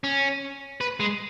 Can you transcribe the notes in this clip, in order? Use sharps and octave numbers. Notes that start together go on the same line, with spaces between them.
C#4
B4
G#3